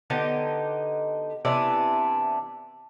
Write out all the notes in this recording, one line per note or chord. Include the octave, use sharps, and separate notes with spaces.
D3 B3 D#4 G4
C3 E3 B3 D4